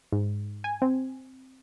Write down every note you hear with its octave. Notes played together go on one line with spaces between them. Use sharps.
G#2
G#5
C4